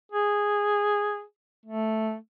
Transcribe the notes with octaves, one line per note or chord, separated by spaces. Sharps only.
G#4
A3